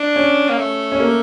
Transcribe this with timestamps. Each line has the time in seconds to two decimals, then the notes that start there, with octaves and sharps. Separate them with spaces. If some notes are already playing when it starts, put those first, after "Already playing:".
Already playing: D4
0.16 C#4
0.49 A#3
0.58 A3
0.92 C#4
1.00 A#3